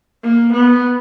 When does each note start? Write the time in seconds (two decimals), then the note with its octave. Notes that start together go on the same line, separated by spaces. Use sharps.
0.23 A#3
0.53 B3